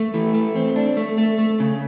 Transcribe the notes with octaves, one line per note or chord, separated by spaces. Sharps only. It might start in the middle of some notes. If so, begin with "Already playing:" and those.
Already playing: A3
E3
A3
C4
D4
A3
A3
A3
C#3